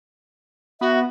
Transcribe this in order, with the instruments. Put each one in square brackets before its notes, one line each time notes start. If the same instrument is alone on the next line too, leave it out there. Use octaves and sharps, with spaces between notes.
[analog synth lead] B3 [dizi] F#4 [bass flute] E5